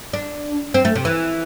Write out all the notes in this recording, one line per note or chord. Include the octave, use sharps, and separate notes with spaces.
D4
C4
A3
C3
E3